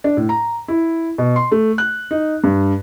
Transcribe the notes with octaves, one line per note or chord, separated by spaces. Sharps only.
D4
A2
A#5
E4
B2
C6
A3
F#6
D#4
G2